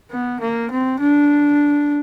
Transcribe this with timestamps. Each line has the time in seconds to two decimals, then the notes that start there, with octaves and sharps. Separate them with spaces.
0.11 B3
0.41 A#3
0.71 C4
1.00 D4